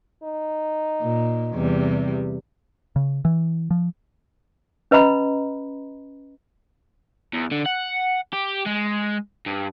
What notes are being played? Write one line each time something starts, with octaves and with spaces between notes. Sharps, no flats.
D#4
A#2
E2 C3 G3
C#3
E3
F3
C#4 B4 D#5 A#5 B5
E2
D3
F#5
G4
G#3
G2